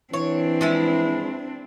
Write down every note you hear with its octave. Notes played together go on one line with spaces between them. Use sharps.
E3 C4 D4 C#5
F3 G#3 E4